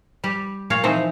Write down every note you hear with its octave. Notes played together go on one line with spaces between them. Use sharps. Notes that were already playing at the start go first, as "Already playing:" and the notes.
G3 G4
A#2 A#4 C#5 F5
E3 F3 C4 D#4 C5